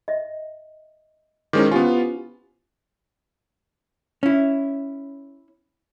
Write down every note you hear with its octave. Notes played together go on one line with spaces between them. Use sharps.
D#5 E5
D#3 G#3 C#4 E4 C5 D6
B3 C#4 F4 G4 G#5
C#4 E4